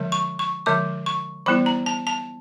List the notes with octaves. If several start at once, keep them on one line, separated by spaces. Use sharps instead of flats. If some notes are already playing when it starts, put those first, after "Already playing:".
Already playing: D3 F3 G#3
C#6
C#6
D3 F3 G#3 D6
C#6
E3 G3 B3 E4 B5
A#5
A5
A5